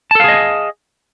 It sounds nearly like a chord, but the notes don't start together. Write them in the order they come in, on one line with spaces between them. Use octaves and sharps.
A5 A4 F5 G#4 D#5